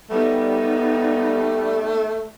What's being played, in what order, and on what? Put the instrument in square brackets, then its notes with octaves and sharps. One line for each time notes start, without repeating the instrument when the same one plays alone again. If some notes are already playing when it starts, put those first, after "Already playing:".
[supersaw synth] G3 [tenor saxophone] A3 [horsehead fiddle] B3 D#4